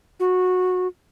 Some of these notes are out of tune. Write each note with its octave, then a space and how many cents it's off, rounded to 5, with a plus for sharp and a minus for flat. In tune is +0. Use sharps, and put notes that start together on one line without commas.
F#4 -15